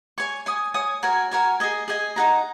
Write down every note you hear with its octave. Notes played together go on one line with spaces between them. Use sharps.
C#5 G#5 C#6
C#5 G#5 D#6
C#5 G#5 D#6
F#4 A#4 C#5 G#5
F#4 A#4 C#5 G#5
G#4 D#5 G#5
G#4 D#5 G#5
D#4 G#4 F#5 A#5